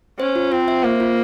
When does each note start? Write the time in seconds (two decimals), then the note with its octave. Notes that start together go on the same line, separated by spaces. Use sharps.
0.19 C#4 C5
0.36 F4
0.52 C4 F4
0.68 E5
0.84 A#3 C5
1.00 F4